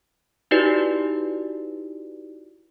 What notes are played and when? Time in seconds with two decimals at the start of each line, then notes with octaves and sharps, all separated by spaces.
0.51 D#4 E4 F#4 G4 B4 D5